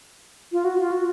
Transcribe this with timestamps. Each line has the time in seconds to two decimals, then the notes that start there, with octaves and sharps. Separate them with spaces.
0.52 F4
0.65 F#4
0.79 F4
0.92 F#4